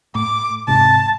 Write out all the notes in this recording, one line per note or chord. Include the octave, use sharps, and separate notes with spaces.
A2 D6
E1 G#2 C3 A5